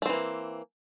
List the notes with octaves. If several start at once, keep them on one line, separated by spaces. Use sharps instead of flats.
E3 A3 A#3 C4